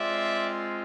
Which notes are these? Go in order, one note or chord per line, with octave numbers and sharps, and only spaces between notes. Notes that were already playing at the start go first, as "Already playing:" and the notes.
Already playing: G#3 C4 F4 D5 E5